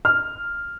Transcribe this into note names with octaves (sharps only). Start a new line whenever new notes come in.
F6